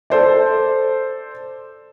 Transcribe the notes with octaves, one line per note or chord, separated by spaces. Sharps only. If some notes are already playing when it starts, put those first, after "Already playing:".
A4 C5 D5